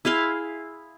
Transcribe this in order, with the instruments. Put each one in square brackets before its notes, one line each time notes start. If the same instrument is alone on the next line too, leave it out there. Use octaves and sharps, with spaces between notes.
[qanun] E4 G#4 F5 C6